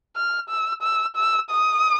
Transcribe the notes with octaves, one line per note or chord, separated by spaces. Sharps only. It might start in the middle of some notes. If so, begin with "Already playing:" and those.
F6
E6
E6
E6
D#6